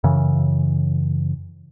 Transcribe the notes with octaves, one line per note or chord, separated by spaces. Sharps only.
F#2 C#3 E3